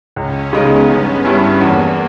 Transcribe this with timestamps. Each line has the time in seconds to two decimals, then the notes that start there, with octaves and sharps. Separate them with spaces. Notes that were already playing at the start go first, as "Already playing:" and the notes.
0.16 C#2 C#4
0.53 C#3 G#3 B3 D#4
0.89 G1
1.25 G2 G3 C#4 E4
1.61 E2 A#3